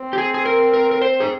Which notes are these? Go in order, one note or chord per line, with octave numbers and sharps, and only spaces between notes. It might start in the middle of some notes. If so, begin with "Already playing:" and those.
Already playing: C4
G4
G#4
G#4
A#4
A#4
A#4
C5
G#4